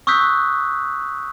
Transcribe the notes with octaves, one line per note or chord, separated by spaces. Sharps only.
C#6 D#6 E6 F#6 G6 B6